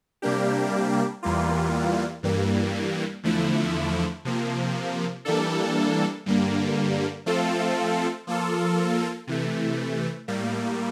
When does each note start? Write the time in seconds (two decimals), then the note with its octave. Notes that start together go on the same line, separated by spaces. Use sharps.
0.22 C3 G3 A#3 D4 G4
1.23 E2 E3 G3 A#3 F4
2.23 G2 E3 G3 A#3
3.23 E2 D3 F3 A3 E4
4.25 C3 F3 A#3
5.25 E3 G3 A#3 D4 A4
6.26 G2 D3 G3 A#3
7.26 F3 A3 C4 F4 A4
8.27 F3 A#3 F4 A4
9.27 C3 E3 A3
10.28 A2 G3 A#3